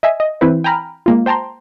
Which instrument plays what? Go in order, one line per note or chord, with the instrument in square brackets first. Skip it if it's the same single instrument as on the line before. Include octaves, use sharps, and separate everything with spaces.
[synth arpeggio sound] D#5 E5 G#5
D#5
E3 C4 E4 B4 C5
G5 G#5 A#5 B5 F6
G#3 A#3 F4
C5 G5 A5 A#5 C6